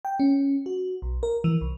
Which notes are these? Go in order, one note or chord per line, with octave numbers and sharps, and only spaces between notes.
G5
C#4
F#4
B1
A#4
E3
C2